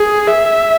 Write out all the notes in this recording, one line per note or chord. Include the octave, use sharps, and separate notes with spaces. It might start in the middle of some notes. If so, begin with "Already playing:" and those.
Already playing: G#4
E5